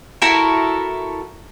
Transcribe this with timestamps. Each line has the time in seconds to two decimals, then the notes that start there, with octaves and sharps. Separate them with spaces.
0.22 E4 F#4 A4 A#4